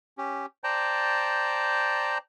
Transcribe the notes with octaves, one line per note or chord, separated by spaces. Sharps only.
C#4 G4
C5 D5 G5 A5 A#5